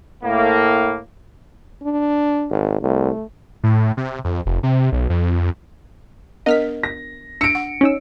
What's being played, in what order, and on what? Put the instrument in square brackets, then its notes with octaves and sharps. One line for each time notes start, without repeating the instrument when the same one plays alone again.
[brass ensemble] A2 A#3
[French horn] D4
[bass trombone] G#1
[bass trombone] C2 [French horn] A3
[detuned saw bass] A2
C3
F2
F1
C3
B1
F2
[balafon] B3 D4 A#4 [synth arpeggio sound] D#5 F6 B6
[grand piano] A#6
[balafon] D4 [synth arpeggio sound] E6 A#6 [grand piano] C#7 D7
[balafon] F#5
[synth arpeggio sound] C#4 D#4 E6